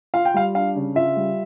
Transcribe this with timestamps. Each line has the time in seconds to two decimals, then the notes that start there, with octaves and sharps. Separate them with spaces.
0.14 F4 F5
0.25 G5
0.34 G3 F5
0.55 D4 F5
0.76 C#3
0.95 F4 E5
1.16 G3